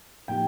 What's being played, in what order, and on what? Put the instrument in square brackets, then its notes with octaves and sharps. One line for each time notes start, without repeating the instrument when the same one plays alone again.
[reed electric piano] A2 F3 A#3 D#4 G4 [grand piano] G5